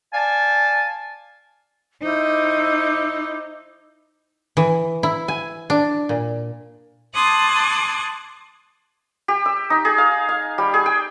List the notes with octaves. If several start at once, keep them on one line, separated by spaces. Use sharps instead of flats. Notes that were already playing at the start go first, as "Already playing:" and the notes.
D5 F5 G#5 A5
D#4 E4 C5 D6
E3
E4
G#5
D4
A#2
A5 C6 D6 D#6 F#6 G#6
G4
E6
D#4
G#4
F5
F5
G3
G#4
G5